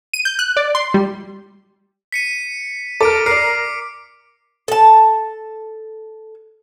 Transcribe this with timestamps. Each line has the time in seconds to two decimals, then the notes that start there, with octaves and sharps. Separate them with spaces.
0.13 D#7
0.25 G6
0.39 F#6
0.57 D5
0.75 C6
0.94 G3
2.12 B6 C#7 D#7
3.01 A4 A#4 D6 D7
3.26 A#4 D5 C7
4.68 A4 A5